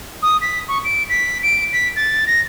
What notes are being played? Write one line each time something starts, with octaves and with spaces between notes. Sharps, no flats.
D#6
B6
C#6
D7
B6
D7
B6
A6
A#6